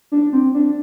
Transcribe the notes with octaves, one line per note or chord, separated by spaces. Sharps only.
D4
C4
D4